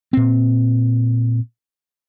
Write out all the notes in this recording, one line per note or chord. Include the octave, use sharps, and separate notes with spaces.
A#2 C4